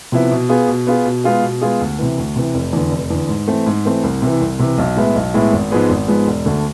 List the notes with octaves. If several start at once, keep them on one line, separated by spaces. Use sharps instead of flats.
C3 F3 B3 E4
B2
B3 F4 G#4
B2
B3 F4 G#4
B2
G#3 B3 F4 G#4
B2
G#3 B3 F4 G#4
D2
C3 E3
D2
C3 E3
F1
E2 D3
F1
E2 D3
G#2
E3 A3 C4
G#2
E3 A3 C4
C2
C3 E3
C2
C3 E3
B1
A2 G#3 B3 E4
B1
A2 G#3 B3 E4
G#1
G#2 F3 G#3 B3
G#1
G#2 F3 G#3 B3
E1
D2 D3 A3